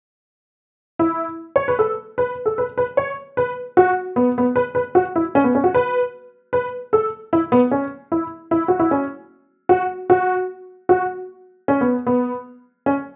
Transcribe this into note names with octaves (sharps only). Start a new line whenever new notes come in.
E4
C#5
B4
A4
B4
A4
B4
B4
C#5
B4
F#4
B3
B3
B4
B4
F#4
E4
C#4
B3
C#4
F#4
B4
B4
A4
E4
B3
C#4
E4
E4
F#4
E4
C#4
F#4
F#4
F#4
C#4
B3
B3
C#4